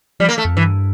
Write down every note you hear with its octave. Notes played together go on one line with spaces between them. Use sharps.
F3 G3
A#3
A3
F2
G2 E3